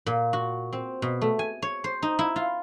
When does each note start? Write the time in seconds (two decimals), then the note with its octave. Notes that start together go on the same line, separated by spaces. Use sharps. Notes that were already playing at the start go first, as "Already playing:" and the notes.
0.06 A#2
0.33 F#4
0.73 C4
1.02 B2
1.21 A3
1.39 G#5
1.62 C#5
1.84 C5
2.02 D#4
2.19 E4
2.36 F4